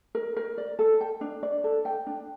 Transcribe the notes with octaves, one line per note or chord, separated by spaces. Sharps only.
A#4
A#4
D5
A4
G5
D4
D5
A4
G5
D4